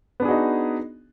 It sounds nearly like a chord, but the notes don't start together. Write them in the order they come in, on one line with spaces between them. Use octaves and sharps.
B3 D4 G#4 F#4 D#4